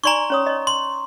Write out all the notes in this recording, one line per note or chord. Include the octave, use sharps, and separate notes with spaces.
D#4 D5 G#5 A#5 C6 C#6
C#4 C#5 D#6
C#5 D#5
C6